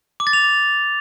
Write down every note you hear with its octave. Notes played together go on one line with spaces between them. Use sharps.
D6
A6
F7